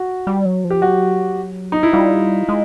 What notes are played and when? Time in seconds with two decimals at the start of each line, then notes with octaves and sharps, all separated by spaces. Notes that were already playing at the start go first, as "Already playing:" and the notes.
Already playing: F#4
0.27 G3
0.45 F#3
0.64 F3
0.71 G4
0.82 F#3 F#4
1.72 D#4
1.83 E4
1.93 G3 F4
2.49 G#3